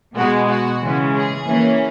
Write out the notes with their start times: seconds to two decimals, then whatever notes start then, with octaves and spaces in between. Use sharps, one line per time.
0.17 B2 G#3 B3 F#4
0.49 F#4
0.82 C#3 E3 G#3 C#4
1.15 G#4
1.47 E3 A#3 C#4